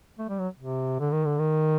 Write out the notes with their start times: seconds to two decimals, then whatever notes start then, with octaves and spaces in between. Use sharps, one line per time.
0.18 A3
0.29 G3
0.39 F#3
0.58 C3
0.99 D3
1.12 D#3
1.25 D3
1.38 D#3